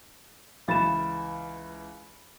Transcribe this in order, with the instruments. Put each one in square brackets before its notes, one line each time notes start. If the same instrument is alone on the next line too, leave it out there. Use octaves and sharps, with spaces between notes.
[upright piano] C#2 E3 A6 [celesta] F5 B5 E7